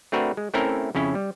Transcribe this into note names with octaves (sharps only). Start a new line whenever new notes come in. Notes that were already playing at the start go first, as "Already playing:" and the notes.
A3 C4 D4 F#4 A#4 B4
G#3
A3 C4 C#4 E4 A4 A#4
F2 C#3 C#4 E4
G3